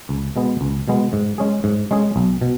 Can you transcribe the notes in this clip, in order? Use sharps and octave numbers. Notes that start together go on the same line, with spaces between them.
C#2
B2 G#3 B3
C#2
B2 G#3 B3
G#2
G#3 C#4 G#4
G#2
G#3 C#4 G#4
B1
B2